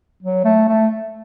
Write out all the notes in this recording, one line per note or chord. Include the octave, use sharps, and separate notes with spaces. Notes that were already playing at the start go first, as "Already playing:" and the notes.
F#3
A3
A3